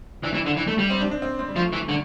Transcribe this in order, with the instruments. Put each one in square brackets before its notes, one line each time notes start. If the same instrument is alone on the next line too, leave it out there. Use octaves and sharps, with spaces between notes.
[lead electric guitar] E3 [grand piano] D4
[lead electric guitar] E3 [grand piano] E4
[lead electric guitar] D3 [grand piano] D4
[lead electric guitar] E3
A3
G3
[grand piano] C4
D4
D4
C4
C4
G3
[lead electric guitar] F3 [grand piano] A3
[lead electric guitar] E3
[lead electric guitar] D3 [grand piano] G3